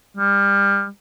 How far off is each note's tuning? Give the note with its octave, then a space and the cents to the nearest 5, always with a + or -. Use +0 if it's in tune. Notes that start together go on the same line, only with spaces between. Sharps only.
G3 +30